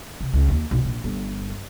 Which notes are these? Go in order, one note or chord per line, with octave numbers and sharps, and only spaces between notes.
C2
C#2
D#2
B1
A#1
G1